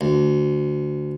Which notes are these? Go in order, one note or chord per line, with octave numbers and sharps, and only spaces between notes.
D2